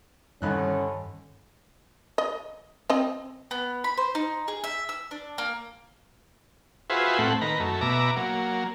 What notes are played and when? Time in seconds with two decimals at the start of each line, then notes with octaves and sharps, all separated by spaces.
0.42 C2 G2 D3 D#3 C#4 D#4 B5 F#6
2.18 D#5
2.90 C4 D#5
3.51 B3
3.84 B5
3.97 C5
4.15 D#4
4.48 G#4
4.64 E5
4.89 E6
5.11 D4
5.38 A#3
6.90 F4 F#4 G#4 B4 C5 E5
7.18 A2 A3 C4 F#5
7.41 D#3 B4 A#5
7.60 F#2 A3
7.81 B2 E5 A#5 D6
8.16 F#3 A#3